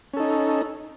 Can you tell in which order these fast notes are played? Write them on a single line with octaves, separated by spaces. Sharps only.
C#4 A4 D#4